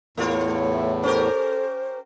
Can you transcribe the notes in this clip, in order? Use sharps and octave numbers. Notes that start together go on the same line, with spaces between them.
E2 A2 A3 F4 C#5
E5
C#4 G4 A4 A#4 C5